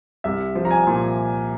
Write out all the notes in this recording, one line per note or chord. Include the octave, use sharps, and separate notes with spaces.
C2 E5
F3
A#5
G#5
A#2